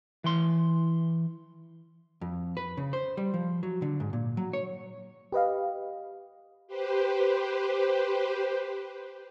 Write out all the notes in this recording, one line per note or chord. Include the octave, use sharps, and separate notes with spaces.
E3 C6
F2
B4
C#3
C5
G3
F3
F#3
D3
G#2
A#2
F#3
C#5
G4 B4 D#5 F5
G4 B4 C5